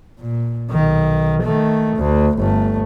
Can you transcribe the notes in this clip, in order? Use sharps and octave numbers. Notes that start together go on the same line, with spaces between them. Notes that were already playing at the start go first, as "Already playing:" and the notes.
A#2
B1 D#3
D#3 A3
D2
G1 A3